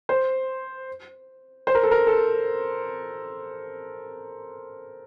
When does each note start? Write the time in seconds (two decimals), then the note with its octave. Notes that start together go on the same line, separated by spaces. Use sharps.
0.09 C5
1.67 C5
1.75 A#4
1.83 A4
1.91 A#4
2.07 A4